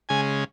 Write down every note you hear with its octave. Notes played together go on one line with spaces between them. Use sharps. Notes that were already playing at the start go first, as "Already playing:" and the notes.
C#3 G#3 G#5